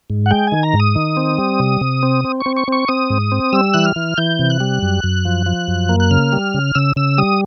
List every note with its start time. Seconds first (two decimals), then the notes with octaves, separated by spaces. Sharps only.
0.10 G#2
0.26 F#5
0.31 G#3 G5
0.47 D#3 G#5
0.63 A#5
0.74 G#2
0.80 D#6
0.96 D#3
1.17 C4
1.38 G3
1.60 C3
1.81 C3
2.03 C4
2.25 C4
2.40 C#6
2.46 C4
2.56 C#6
2.68 C4 C#6
2.88 C4 D#6
3.10 G#2
3.32 C4
3.53 G3 E6
3.74 E3 F#6
3.85 F6
3.96 E3
4.18 E3 G6
4.39 C3
4.50 F#6
4.60 G3
4.82 F#2
5.04 F#2
5.25 F3
5.46 F3
5.68 F#2
5.89 A#3
6.00 F#6
6.11 C#3 F6
6.33 G3
6.54 C#3
6.75 C#3 E6
6.96 C#3 E6
7.18 G3 D#6